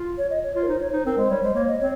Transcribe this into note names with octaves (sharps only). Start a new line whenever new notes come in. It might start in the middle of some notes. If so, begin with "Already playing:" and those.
Already playing: F4
C#5
D#5
C#5
F4 C#5
A#4
D#4 C5
C#5
D#4 C5
C4 A#4
G#3 C5
G3 C#5
G#3 C5
A#3 C#5
D#5
C4 C#5